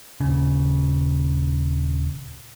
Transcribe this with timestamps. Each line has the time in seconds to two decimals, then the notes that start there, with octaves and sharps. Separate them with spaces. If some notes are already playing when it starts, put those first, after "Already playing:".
0.20 D#1 C#3